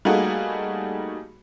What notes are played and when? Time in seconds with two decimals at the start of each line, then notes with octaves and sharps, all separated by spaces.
0.05 G3 A3 A#3 D#4 F#4 G#4